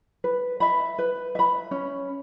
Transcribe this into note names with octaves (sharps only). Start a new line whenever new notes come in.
B4
E5 B5
B4
E5 B5
C#4